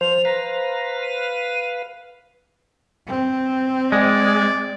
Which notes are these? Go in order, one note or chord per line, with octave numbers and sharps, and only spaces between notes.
F3 C5 F7
B4 F5 A#5
D#7
C4
G#3 D5